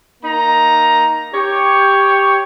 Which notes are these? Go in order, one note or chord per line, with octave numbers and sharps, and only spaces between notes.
A#3 D#4 A#5
G4 C#5